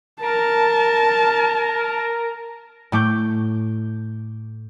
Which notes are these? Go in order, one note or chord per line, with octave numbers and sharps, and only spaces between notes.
A#4 A5
A2 A3 D6 G6